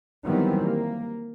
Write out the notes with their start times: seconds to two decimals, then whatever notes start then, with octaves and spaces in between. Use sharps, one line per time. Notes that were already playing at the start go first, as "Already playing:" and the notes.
0.24 D#3 E3 F#3 G3 B3 C4
0.63 A#3